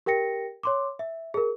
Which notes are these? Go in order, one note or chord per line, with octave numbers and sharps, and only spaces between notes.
G4 A#4 G5 A#6 C#7
C#5 C6 D6
E5
G#4 A#4